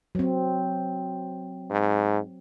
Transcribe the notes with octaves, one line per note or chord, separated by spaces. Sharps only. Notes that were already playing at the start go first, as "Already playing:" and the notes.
F#3 C4
G#2